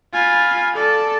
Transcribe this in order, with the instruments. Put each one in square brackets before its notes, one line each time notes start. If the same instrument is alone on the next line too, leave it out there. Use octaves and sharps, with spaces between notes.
[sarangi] F4 [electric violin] G#5 B5
[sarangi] A4 [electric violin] D5 A5